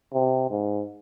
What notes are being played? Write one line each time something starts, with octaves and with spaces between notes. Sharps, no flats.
C3
G#2